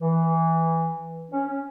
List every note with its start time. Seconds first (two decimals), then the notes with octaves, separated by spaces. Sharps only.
0.01 E3
1.31 C#4
1.47 C#4